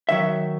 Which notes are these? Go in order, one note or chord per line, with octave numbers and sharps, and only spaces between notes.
D#3 F#3 E5